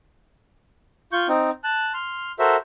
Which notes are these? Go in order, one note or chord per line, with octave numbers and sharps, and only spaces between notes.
F4 C#6 G6
C4 D#4
A5 F#6
C6 F6
F#4 A4 A#4 C5 E5